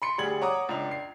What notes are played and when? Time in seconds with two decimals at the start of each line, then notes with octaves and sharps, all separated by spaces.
0.02 B5 C6 C#7
0.18 D2 G3 G#4 B5 G#6 F#7
0.41 C#5 F#5 A#5 D6 D#6
0.69 C#2 D4 A#5 F7
0.91 C7